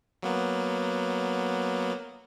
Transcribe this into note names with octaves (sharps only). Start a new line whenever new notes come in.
F#3 A#3 B3